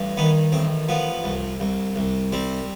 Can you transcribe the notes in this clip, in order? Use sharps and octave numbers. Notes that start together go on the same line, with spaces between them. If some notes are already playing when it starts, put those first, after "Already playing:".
Already playing: A1 G2
D#3 B3
A1 C4
F3 B3
C2
C2
C2
G3 C4